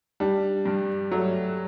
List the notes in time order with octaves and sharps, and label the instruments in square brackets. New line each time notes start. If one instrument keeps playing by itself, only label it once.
[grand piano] G3 [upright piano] D4
[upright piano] G2
[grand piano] F#3 [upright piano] A3